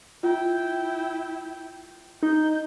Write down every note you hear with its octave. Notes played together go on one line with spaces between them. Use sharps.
E4 F4 G5
D#4 G6